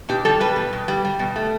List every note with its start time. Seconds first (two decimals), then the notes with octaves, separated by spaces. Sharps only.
0.09 B2 G4
0.25 G3 A4
0.40 G3 B4
0.56 B2
0.73 B2
0.88 G3
1.05 G3
1.19 B2
1.36 A3